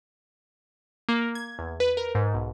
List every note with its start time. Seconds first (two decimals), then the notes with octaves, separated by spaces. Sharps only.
1.09 A#3
1.35 G#6
1.59 E2
1.80 B4
1.97 A#4
2.15 G#2
2.34 B1